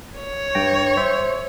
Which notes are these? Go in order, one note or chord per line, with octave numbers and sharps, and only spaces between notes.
C#5
G2 G5 A#6
C5 E5 C6